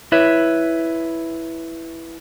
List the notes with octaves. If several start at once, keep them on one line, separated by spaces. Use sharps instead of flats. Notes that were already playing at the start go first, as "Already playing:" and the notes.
E4 B4 C#5 E5